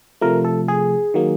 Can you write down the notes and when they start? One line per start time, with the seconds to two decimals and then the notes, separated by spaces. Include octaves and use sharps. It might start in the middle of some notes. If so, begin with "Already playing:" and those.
0.21 C3 F3 A3 A#4
0.44 A4
0.68 G#4
1.14 D#3 F#3 A#3